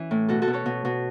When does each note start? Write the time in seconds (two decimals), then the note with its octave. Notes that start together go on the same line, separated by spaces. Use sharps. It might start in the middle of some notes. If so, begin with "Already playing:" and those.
Already playing: E3 C#4 E4
0.11 A2
0.28 B2 F#4 A4
0.42 F#4 A4
0.48 B2
0.53 A4 C#5
0.66 B2
0.85 B2